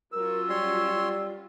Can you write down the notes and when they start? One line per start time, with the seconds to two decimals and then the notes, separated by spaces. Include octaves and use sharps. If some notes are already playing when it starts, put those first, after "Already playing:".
0.13 F#3 C#4 F4 A#4 E6
0.50 G3 C#5 C6